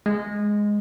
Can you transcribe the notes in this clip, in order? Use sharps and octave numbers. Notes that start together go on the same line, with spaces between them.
G#3